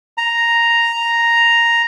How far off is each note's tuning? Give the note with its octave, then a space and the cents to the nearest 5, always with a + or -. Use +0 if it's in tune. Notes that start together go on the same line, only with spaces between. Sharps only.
A#5 +0